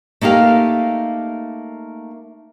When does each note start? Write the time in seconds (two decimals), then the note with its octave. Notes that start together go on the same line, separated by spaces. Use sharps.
0.21 A3 A#3 D#4 G4 F5